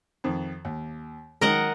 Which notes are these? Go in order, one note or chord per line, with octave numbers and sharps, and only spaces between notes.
F2 D#3
D#2
D#3 F#3 G#3 A#4 D#5 F#5